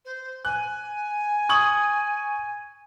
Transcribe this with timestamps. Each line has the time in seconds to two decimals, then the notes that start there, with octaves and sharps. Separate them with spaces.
0.05 C5
0.45 G#5 F#6
1.49 C#6 D#6 G#6 F#7